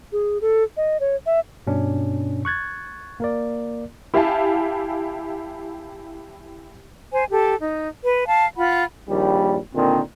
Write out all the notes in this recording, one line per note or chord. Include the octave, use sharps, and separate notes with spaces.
G#4
A4
D#5
C#5
E5
G2 B2 C#4 D4
C#6 F#6 G#6 A6
A#3 A#4 D5
E4 G4 E5 F5 G#5 A5
C5 G#5
G4 A4
D#4
B4
F5 A5
F4 F#5 B5
A#1 D#2 G3
A#2 D3 D#3 C4